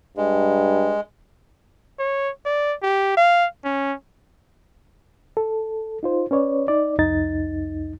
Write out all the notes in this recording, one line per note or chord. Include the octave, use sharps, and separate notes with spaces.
G2 G#3
C#5
D5
G4
F5
C#4
A4
D#4 F4 C5
C#4 B4 C#5 D5
D#4 D5
C2 F2 D#4 A6